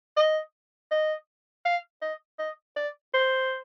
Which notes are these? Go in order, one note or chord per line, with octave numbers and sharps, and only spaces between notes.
D#5
D#5
F5
D#5
D#5
D5
C5